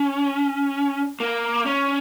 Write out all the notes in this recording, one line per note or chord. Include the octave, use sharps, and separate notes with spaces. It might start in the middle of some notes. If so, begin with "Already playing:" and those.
Already playing: C#4
A#3
C#4